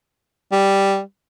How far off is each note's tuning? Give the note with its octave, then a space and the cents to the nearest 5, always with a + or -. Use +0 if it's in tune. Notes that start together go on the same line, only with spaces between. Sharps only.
G3 +0